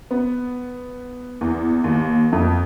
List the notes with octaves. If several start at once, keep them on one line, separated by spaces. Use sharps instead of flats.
B3
E2
D#2
F2